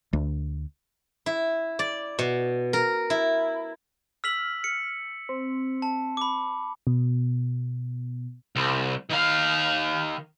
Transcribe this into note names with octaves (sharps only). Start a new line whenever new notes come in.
D2
E4
D5
B2
A#4
E4
E6 F6 B6 F#7
C#7
C4
A5
B5 D6
B2
C2
D#3 F5